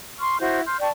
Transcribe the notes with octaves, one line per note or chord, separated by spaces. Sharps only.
C6 C#6 F6
E4 F#4 C5 G6
C6 F6 G6
D5 G5 A5 C#6